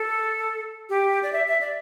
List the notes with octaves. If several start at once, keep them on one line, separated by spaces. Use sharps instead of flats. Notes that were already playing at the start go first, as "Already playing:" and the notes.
Already playing: A4
G4
D5
E5
E5
D5